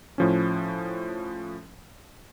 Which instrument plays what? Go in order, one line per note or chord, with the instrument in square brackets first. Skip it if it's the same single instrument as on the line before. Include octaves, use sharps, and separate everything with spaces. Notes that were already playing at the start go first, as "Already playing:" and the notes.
[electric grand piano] A2 F3 C#4